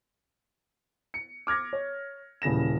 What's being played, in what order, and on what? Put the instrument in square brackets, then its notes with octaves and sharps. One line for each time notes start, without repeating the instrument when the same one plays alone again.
[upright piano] C#7
D6 F6 G#6 A#6
C#5
D#1 C#3 E3 A#6 E7